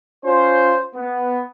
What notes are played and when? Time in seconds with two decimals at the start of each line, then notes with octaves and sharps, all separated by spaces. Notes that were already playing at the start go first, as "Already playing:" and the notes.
0.24 C#4 F4 C5
0.95 B3